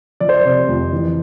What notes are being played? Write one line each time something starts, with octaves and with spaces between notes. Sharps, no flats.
F3 D5
C5
D5
C3
F2
E3